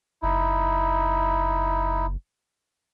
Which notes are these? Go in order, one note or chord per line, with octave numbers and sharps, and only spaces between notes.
F#1 D#4 E4